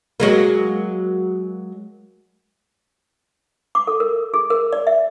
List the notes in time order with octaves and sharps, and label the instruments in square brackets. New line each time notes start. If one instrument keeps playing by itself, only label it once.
[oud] F#3 G#3 A#3
[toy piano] D6
A4
A#4
G#4
A#4
D5
E5